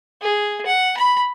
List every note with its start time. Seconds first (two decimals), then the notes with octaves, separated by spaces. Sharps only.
0.21 G#4
0.66 F#5
0.97 B5